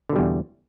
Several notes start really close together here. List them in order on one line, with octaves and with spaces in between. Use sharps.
D3 B2 G3 E2